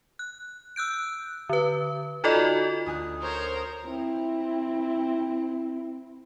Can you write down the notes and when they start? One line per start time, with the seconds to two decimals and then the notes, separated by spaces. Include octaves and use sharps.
0.19 F#6
0.76 E6 F#6 G6 D7
1.49 D3 B4
2.24 D#4 F4 F#4 A4 D5 D#5
2.86 D2 G#5 D#6 F#6
3.23 A#4 C5 C#5
3.85 C4 E4